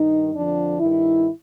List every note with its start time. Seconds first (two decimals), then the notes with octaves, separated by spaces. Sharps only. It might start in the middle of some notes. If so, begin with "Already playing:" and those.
Already playing: G2 D#3 D#4
0.33 F2 D3 F3 D4
0.80 G2 D#3 E4